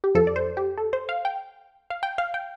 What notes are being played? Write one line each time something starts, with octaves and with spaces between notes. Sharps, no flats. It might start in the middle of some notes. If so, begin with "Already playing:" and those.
G4
F2 F3 A4
D5
C5
G4
A4
C5
F5
G5
F5
G5
F5
G5